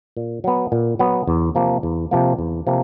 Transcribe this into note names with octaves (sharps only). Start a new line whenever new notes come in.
A#2
F#3 B3
A#2
F#3 B3
E2
C3 F3 A#3
E2
C3 F3 A#3
E2
C3 F3 A#3